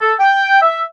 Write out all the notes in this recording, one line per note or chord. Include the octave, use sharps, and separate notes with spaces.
A4
G5
E5